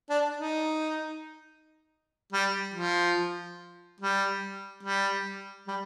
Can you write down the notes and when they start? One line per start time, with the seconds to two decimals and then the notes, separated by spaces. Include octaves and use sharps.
0.10 D4
0.38 D#4
2.32 G3
2.74 F3
4.00 G3
4.83 G3
5.67 G3